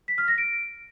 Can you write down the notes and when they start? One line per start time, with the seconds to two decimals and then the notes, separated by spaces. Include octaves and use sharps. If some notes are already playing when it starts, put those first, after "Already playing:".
0.08 B6
0.18 F6
0.28 A#6
0.38 D7